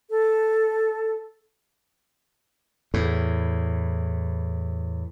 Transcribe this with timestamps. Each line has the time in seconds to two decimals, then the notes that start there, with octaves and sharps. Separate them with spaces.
0.10 A4
2.94 E2 A2